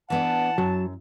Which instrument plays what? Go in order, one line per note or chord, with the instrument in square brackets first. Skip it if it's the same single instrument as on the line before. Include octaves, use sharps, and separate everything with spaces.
[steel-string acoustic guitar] E3 B3 D4 [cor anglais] F#5 [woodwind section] A5
[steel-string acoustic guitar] F#2 [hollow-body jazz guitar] F#3